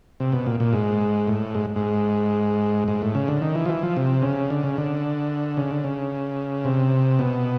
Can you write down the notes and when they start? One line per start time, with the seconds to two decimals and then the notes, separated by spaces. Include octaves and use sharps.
0.20 C3
0.32 B2
0.46 A#2
0.60 A#2
0.73 G#2
1.27 A2
1.55 G#2
1.76 G#2
2.88 G#2
3.02 A2
3.15 C#3
3.28 D3
3.42 D#3
3.55 E3
3.66 F3
3.69 E3
3.83 F3
3.97 C3
4.22 C#3
4.50 D3
4.63 C#3
4.78 D3
5.57 C#3
5.71 D3
5.84 C#3
6.65 C3
7.19 B2